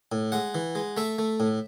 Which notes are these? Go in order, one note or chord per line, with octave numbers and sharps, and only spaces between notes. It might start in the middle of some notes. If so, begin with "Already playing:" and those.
A2
G#3 F#5
E3
G#3
A3 E5
A3
A2